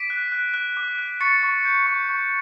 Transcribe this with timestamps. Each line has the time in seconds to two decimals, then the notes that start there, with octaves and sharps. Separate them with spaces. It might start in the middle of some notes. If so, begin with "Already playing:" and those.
Already playing: D6 B6 D7
0.10 F#6
0.32 F#6
0.54 F#6
0.77 D6
0.98 F#6
1.21 C#6 A6 C#7
1.43 C#6
1.65 G6
1.86 C#6
2.09 C#6